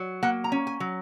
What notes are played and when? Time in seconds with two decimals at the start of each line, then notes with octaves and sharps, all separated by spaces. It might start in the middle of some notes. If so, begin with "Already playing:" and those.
Already playing: F#3
0.23 A#3 F#5
0.44 A#5
0.52 C#4
0.67 G#5
0.80 F#3